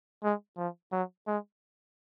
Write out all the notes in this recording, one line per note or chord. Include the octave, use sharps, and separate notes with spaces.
G#3
F3
F#3
G#3